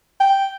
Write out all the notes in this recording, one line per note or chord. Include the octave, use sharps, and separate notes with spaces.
G5